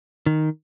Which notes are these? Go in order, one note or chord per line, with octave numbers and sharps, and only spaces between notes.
D#3